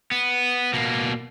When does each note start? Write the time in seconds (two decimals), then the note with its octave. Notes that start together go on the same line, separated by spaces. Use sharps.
0.11 B3
0.73 B2 A#3